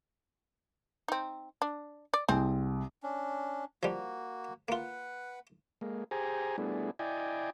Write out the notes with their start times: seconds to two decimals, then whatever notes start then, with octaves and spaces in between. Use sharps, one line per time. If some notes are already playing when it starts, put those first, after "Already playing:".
1.08 C4 D#4
1.62 D4
2.14 D5
2.29 C2 G#3 C4
3.03 C#4 D4
3.83 F3 G3 A#3 F#4
4.68 A#3 F4 B4 F#5
5.81 G#3 A#3
6.11 G4 G#4 C5 G#5 A#5
6.58 G3 A3 B3 D4 E4 G#4
6.99 E4 D5 D#5 G5 G#5